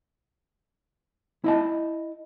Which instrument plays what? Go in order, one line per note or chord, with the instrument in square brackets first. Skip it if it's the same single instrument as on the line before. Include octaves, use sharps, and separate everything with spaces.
[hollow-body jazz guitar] E4 D#5 A5